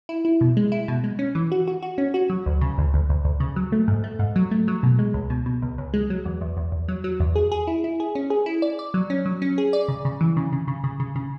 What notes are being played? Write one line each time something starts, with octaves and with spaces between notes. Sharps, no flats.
E4
E4
B2
G#3
E4
B2
G#3
C#4
E3
F#4
F#4
F#4
C#4
F#4
F#3
D2
C#3
D2
D2
D2
D2
C#3
F#3
A3
G#2
A3
G#2
F#3
A3
F#3
B2
G#3
C#2
B2
B2
C#2
C#2
G#3
F#3
E2
E2
E2
E2
F#3
F#3
E2
G#4
G#4
E4
E4
G#4
C#4
G#4
E4
D5
D5
F#3
C#4
F#3
C#4
G#4
D5
C#3
C#3
E3
C#3
C#3
C#3
C#3
C#3
C#3